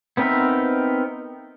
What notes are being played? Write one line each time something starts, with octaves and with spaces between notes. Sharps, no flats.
B3 C4 D#4 A#4 E5